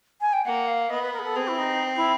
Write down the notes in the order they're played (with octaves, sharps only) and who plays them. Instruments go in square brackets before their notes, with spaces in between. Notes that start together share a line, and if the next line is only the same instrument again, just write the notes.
[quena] G#5
G5
[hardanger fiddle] A#3 [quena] F#5
[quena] F5
[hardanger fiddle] B3 [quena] D#5
[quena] B4
A#4
G#4
A4
[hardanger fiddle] C4 [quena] G#4
[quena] E4
D#4
E4